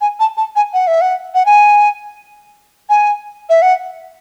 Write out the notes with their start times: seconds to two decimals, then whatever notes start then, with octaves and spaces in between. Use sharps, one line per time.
0.01 G#5
0.20 A5
0.37 A5
0.56 G#5
0.73 F#5
0.87 E5
1.01 F#5
1.34 F#5
1.46 G#5
2.89 G#5
3.49 E5
3.62 F#5